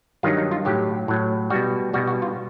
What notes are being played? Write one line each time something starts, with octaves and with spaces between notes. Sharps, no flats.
G2 D#3 F#3 F4
D#4
F4
A2 F#3 G4
A2 F#3
B2 G3 F#4
B2 G3 F#4
F#4
F4